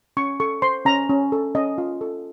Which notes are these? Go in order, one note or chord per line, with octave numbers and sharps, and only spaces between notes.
C#4 C#6
A4 C#6
C5 C6
C#4 A#5
C#4
A4
C#4 D#5
F4
A4